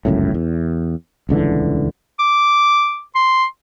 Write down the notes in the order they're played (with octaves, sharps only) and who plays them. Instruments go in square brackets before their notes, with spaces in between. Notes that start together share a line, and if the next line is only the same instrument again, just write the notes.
[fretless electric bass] G1 C#2 F#2 A2
E2
D#1 C#2 D3 E3
[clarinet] D6
C6